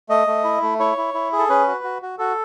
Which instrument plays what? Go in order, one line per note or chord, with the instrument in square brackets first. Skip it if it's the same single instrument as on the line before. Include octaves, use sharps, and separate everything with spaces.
[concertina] A3 D#5
A3
E4
A3
E4 C#5
E4
E4
G#4
A4
C#4 B4
F#4
F#4
F#4
F#4 A4